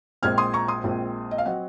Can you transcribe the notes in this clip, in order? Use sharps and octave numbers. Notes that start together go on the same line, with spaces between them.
A#1 A#2 G#3 C4 F6 G#6
C6 D#6
A#5 C#6
C6 D#6
A#1 A#2 G#3 C4
D#5
F5
F#3 C4 D#5 F#5